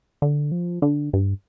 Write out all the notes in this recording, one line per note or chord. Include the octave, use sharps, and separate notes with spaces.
D3
F3
D3
G2